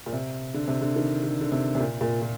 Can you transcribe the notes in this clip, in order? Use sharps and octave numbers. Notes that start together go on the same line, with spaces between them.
A#2
C3
D3
C3
D3
D#3
D3
D3
C3
C3
A#2
A#2
A#2